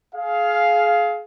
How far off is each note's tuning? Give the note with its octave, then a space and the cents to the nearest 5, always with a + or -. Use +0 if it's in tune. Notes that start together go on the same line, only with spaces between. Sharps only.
G#4 +30 F5 +0